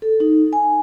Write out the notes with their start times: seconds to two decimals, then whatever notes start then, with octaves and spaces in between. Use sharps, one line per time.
0.02 A4
0.20 D#4
0.53 G#5